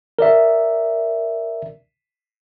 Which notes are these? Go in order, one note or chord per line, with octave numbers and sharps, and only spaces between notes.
A#4 D5 E5